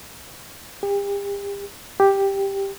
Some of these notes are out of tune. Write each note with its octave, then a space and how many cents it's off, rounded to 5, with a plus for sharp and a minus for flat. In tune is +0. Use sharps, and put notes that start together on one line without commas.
G4 +40
G4 +5